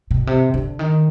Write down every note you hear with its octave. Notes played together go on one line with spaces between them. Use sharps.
B2
C3
D3
D#3